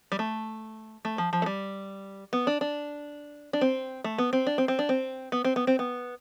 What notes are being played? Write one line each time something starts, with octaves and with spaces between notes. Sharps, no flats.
G3
A3
A3
F3
F3
A3
G3
B3
D4
D4
D4
C4
A3
B3
C4
D4
C4
C4
D4
C4
B3
C4
B3
C4
B3